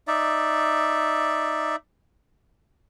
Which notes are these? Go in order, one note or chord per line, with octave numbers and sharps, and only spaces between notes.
D#4 D5 E5